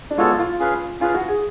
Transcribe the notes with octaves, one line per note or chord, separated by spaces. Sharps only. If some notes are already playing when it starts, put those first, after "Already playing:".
D4
G#3 B3 F4 F#4 A4 C#5
F4
C#4 G#4 B4 F5
C#4 F4 G#4 B4 F5
F#4
G#4